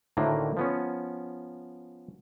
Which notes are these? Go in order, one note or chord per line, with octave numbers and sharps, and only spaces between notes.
D2 A2 D3 D#3 A#3
F3 B3 C#4